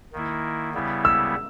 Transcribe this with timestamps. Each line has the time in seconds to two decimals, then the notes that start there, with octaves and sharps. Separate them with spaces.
0.13 D#3 A#3 E4
0.74 C#3 G3 B3 E4
1.05 E6